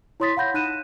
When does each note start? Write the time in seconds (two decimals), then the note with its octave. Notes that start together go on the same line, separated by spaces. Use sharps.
0.20 E4 C#5 C6 D#6 A6 B6
0.37 F5 F#5 B5 G6 A#6
0.54 D#4 F#6 D#7 E7